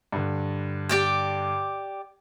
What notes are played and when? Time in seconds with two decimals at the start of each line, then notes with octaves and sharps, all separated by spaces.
0.12 G2 D3
0.89 G4 D5 G5